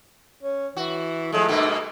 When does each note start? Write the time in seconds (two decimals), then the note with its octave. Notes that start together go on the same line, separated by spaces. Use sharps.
0.43 C#4
0.77 E3 F#4
1.32 F3 G#3 A3
1.49 G2 B2 A#3